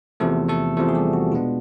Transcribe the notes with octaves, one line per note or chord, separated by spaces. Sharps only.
E2 C3 F3 A3 A4
A3 A4
E2 C3 F3 A3 A4
G#4
G3 G4
F#4
B2 G#3 B3 D4 F4